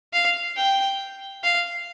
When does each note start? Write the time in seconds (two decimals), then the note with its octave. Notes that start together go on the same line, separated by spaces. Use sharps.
0.13 F5
0.57 G5
1.43 F5